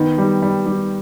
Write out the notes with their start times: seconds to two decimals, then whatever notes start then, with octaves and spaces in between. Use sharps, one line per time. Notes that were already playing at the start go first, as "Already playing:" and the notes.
Already playing: D#3 B3
0.18 G3
0.42 G3
0.66 G3